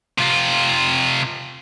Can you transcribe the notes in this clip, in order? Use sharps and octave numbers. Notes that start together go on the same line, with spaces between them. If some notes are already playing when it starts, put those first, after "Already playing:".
C3 F4